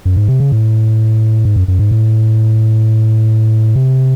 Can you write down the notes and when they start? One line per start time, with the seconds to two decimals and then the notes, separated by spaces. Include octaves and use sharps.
0.05 F#2
0.16 G#2
0.28 C3
0.40 C#3
0.52 A2
1.45 G#2
1.56 F#2
1.68 F#2
1.79 G#2
1.91 A2
3.76 C3